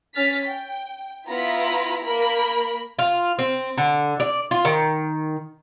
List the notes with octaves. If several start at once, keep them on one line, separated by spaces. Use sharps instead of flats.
C#4 F6 A6 B6
G5
B3 E4 F4 A#5 B5 B6
A#3 A#4 B5
F4
C4
D3
D5
F4
D#3